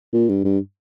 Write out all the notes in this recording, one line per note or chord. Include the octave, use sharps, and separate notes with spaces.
A#2
G2
G2